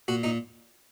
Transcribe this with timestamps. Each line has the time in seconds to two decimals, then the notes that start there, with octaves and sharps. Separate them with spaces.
0.08 A#2 F#4
0.23 A#2 D#4